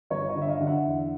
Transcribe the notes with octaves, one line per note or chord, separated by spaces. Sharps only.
G1 C#5 D#5
C#5 D#5
D3
E5
D#5 F5
D3
E5 F#5
E2